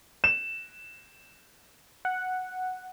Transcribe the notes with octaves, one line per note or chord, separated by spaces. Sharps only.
E7
F#5